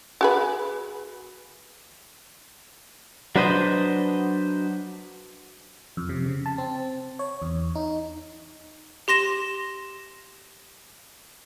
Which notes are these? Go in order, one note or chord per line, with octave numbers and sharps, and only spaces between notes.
F#4 G#4 B4
F#3 D4 B4 C5 D#5
F2
C3
C#3
A5
C4
C#5
E2
D#4
G4 C6 A#6 E7